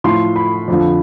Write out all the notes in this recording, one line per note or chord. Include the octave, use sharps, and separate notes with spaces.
A2 F3 C6
B5
F2 D3 F3